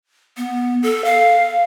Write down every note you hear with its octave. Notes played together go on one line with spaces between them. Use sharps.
B3
A4
F5